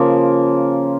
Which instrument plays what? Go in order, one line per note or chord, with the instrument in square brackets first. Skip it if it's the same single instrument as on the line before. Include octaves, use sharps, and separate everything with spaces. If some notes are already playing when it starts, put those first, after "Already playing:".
Already playing: [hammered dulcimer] C#3 F3 A#3 F4